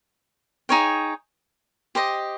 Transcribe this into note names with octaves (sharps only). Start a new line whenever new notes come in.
D#4 G#4 C#5 G5
G4 C5 D#5